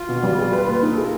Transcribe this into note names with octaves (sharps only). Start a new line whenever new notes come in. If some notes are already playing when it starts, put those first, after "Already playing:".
Already playing: F4
B2
G3
G#4
B4
A#3
D#4
A4
G#4 A#4